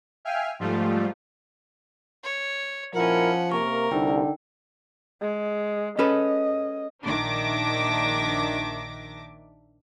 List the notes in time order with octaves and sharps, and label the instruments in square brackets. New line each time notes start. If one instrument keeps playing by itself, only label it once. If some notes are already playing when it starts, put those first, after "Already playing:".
[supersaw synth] E5 F5 G5 G#5 F6
G#2 F3 G3 A3 F4
[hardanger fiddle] C#5
[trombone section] A#2 E4 A#4 [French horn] F3 [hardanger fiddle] C#4 F#5
[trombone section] C3 A#3 [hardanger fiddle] A#4 [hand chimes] C#6
[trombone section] C2 [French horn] D3 [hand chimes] D#4 G5
[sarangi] G#3
[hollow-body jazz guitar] C#4 A4 B4 [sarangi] D#5
[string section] A#1 D#3 D4 E5 D6 A#6